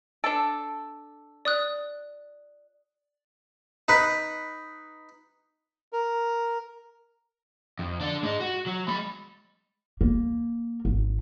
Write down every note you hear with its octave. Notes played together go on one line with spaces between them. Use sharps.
D4 A4 D7
D5 D#6 F#6
D#4 B4
A#4
F2
D4 A4
G#3 D#4
F#4
F#3
G#3 B5
A#3
G#1